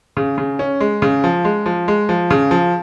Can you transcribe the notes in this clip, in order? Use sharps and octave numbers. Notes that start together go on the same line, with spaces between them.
C#3
C#3
C#4
G#3
C#3
F3
G#3
F3
G#3
F3
C#3
F3